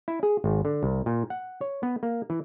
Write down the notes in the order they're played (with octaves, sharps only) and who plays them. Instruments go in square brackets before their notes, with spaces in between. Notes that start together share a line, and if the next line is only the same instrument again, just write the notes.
[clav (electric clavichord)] E4
G#4
G#1
D3
C2
A#2
F#5
C#5
B3
A#3
E3